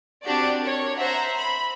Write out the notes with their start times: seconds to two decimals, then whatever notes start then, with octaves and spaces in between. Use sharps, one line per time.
0.23 C4 D4 F#4 G4 D5
0.61 A#4 C#5
0.97 C5 E5 F#5 A#5
1.36 B5